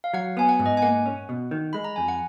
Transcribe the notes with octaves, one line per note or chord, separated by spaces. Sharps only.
F5
F#3 F#5
B3 G#5
F#5
G#2
D#5
G#5
A#3 F#5
C#4
B2
D#3
G#3 B5
A#5
F2 G#5
F#5